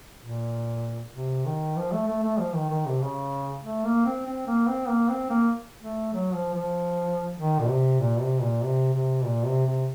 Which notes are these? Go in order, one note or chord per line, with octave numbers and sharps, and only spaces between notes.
A#2
C3
D#3
F3
A3
A3
A3
F3
D#3
D#3
C3
C#3
A3
A#3
C4
C4
A#3
C4
A#3
C4
A#3
A3
F#3
F3
F3
D#3
A#2
C3
A#2
C3
A#2
C3
C3
A#2
C3
C3